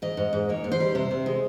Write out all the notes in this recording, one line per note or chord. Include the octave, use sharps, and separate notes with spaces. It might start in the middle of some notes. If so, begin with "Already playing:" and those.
G#2 D#5
G#2
G#2
A#3 C#5
G#2
C5
G3
C3 C5
C3
G#3